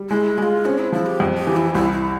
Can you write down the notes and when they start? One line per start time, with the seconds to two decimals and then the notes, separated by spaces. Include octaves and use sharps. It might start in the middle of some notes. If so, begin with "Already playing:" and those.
Already playing: G3
0.10 G#3 E4
0.38 G#3 G4
0.43 F4
0.65 C4 C#4
0.79 E4
0.92 F3 E4
1.06 G4
1.20 F2
1.37 G4
1.47 E3
1.56 E4
1.74 C2 E4
1.92 E4